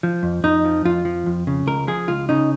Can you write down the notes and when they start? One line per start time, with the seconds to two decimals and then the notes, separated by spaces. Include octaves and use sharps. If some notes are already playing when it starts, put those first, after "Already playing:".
0.03 F3
0.23 F2
0.44 F2 D#4
0.65 F3
0.85 F2 F4
1.05 F3
1.26 F2
1.47 C#3
1.67 C#2 A#4
1.87 F3 G#4
2.08 C#2 F4
2.29 C#3 D#4